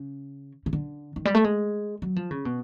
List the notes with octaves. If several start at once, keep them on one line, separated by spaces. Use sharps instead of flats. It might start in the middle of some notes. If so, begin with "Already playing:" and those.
Already playing: C#3
C#3
D3
D#3
G3
A3
G#3
F#3
F3
C#3
B2